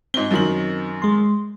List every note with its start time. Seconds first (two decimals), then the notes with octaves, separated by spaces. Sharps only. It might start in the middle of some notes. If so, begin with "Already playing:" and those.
0.14 G#2 C4 G7
0.31 F#2 D#3 F#7
1.02 G#3 C6